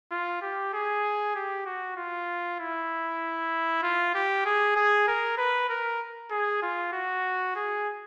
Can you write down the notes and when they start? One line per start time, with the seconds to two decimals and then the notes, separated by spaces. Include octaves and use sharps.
0.11 F4
0.42 G4
0.73 G#4
1.35 G4
1.66 F#4
1.97 F4
2.59 E4
3.83 F4
4.15 G4
4.45 G#4
4.76 G#4
5.07 A#4
5.37 B4
5.69 A#4
6.31 G#4
6.62 F4
6.93 F#4
7.56 G#4